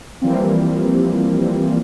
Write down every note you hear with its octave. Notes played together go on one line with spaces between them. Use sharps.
E3 F3 G3 A#3 C4